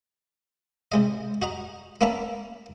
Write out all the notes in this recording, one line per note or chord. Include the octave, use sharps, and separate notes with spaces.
C3 G#3 D#5
F#4 D#5 A#5
A#3 B3 C#4 E5 A5 A#5